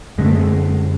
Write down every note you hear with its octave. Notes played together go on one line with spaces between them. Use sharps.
F#2 D3 G#3
A3
G#3